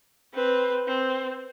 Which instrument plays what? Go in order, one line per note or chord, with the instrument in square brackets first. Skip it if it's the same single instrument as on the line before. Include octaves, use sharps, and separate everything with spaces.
[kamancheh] C4 [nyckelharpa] B4
[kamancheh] C4